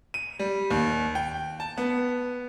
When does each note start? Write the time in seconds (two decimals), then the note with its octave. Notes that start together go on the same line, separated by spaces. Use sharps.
0.14 D#7
0.39 G3
0.71 D#2
1.15 G5
1.60 A5
1.78 B3